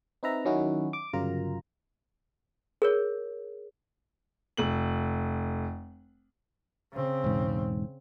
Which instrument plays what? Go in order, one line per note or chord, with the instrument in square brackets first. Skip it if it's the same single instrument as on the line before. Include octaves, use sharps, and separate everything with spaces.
[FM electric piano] C4 D#4 B4 E5 A#5
D#3 F#3 C#4 D#4 E4 F#4
D6
G1 C#3 F#3 F4 A#4 A#5
[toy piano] G#4 A#4 C#5
[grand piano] F1 F#7
[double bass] C#3 C4
[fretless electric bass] E1 G#2